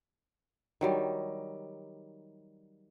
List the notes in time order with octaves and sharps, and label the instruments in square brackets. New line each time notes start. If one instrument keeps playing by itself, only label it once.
[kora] D#3 F#3 G3